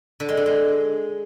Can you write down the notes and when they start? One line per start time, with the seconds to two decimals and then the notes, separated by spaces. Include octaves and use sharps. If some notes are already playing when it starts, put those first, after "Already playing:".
0.20 D3
0.29 G#3
0.37 D3
0.46 G#3